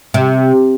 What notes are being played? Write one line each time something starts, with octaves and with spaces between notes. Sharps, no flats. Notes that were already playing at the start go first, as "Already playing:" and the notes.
C3